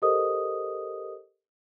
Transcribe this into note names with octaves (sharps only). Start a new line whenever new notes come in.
G4 A4 A#4 C5 D#5 D#6